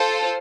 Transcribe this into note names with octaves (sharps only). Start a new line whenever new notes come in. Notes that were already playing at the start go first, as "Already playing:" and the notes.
Already playing: F4 A4 C5